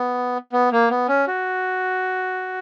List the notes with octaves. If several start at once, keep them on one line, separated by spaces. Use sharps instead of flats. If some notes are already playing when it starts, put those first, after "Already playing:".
Already playing: B3
B3
A#3
B3
C#4
F#4